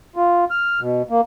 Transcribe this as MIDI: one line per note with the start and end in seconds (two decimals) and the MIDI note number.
0.16 0.45 65
0.51 0.80 89
0.80 1.02 47
1.10 1.21 58